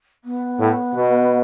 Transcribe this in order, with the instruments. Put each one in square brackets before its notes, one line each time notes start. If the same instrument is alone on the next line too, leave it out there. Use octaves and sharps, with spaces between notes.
[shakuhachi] B3
[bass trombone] A2
B2